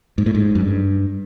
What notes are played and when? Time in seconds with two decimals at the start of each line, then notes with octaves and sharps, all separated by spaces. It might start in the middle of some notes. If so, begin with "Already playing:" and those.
0.18 G#2
0.26 A2
0.35 G#2
0.55 F#2
0.60 G2